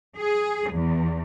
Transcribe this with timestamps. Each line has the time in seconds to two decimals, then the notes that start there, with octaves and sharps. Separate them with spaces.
0.18 G#4
0.73 E2